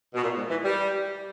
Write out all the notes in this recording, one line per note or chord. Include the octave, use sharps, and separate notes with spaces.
B2
A#2
G#2
E3
G3